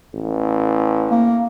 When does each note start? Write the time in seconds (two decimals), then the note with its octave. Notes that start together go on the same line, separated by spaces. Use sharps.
0.14 A1
1.11 A#3